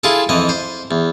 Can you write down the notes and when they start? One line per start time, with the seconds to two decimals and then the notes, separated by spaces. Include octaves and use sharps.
0.04 E4 F4 G#4 A4
0.29 F2 E3 D#5
0.49 C5
0.91 E2